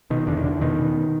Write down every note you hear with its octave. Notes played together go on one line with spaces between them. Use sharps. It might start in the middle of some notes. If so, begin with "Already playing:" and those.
B2 D#3
E2 D3
D#3
E2 D3
B2 D#3
B2